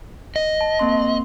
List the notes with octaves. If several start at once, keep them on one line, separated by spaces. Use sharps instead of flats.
D#5
A5
A#3 C4 C6